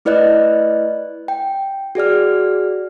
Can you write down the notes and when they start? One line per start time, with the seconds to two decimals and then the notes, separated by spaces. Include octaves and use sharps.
0.05 A3 E4 B4 D5 D#5 F#6
1.28 G5
1.95 F#4 G#4 D5 F6